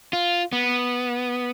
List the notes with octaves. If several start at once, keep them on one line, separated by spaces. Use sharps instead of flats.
F4
B3